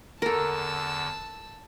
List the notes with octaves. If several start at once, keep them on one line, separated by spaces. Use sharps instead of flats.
E2 D3 A4 A#4 A5 E6